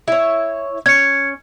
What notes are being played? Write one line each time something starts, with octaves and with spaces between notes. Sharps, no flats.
E4 C#5
C#4 G#6 C#7